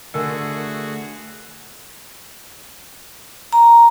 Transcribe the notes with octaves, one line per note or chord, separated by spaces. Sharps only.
D3 A3 F#4 G#4 A#4 D#5 G#5
A#5